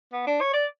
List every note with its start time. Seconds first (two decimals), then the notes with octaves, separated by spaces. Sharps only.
0.13 B3
0.27 D4
0.41 C#5
0.53 D5